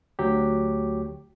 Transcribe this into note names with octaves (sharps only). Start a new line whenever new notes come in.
D2 F#3 G4